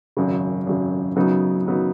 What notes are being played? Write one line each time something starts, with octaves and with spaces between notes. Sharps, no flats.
G#1 F#2 C#3
G#1 F#2 C#3
F#2 C#3 F#3 B3 D#4
F#2 C#3 F#3 B3 D#4